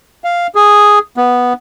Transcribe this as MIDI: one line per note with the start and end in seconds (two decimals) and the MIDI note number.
0.24 0.47 77
0.55 0.99 68
1.17 1.53 59